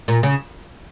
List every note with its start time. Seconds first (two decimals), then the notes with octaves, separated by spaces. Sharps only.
0.08 A#2
0.23 C#3